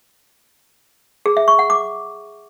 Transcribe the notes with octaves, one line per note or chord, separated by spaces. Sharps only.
G#4
E5
C#6
F#5
D6